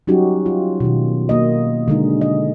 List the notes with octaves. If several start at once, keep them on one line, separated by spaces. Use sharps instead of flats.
F#3 G3 C#4 D#4 F#4 G4
F4
B2 D#3
A#3 D#5
D3 G#3 D#4
D#5